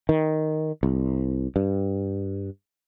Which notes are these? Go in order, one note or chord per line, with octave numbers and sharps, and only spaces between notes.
D#3
C2
G2